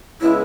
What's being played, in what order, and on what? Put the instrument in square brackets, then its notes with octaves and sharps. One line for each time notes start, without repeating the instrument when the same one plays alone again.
[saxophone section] C#3 G#3 B3 [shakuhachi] E4